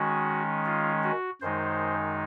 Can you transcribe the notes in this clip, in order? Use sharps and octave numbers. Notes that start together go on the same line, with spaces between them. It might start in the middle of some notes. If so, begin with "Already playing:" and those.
Already playing: D#3 G#3 C#4 F#4
F4
F#4
F#2 D#3 G#3 D#4 C5